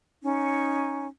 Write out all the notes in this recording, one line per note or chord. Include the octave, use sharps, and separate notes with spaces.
C#4 D#4